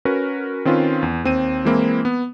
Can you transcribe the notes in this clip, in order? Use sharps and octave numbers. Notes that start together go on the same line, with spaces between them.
C#4 F#4 A#4 B4
D#3 C4 C#4 F4 B4
E2
D#2 C4 D#7
E3 G#3 A#3 C4 E4
B3